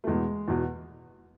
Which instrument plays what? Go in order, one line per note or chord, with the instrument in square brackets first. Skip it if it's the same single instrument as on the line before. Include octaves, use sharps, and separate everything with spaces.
[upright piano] A3
E2 B2 G#3
E2 B2